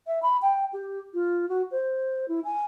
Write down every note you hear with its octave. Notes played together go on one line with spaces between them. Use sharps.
E5
B5
G5
G4
F4
F#4
C5
E4
G#5